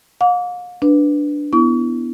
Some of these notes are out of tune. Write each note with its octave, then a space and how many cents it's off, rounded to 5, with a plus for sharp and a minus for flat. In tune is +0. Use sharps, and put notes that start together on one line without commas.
F5 +40 D6 -30
D4 +0 B4 +0
B3 +0 E4 +0 C#6 +40